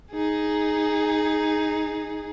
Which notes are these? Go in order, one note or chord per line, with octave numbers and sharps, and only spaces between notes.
D#4 G#4